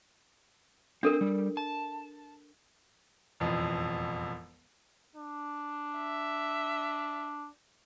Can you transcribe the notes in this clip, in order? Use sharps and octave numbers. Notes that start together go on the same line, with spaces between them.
C4 D4 A4 A#4
G3
A5
E1 A1 F2
D4
E5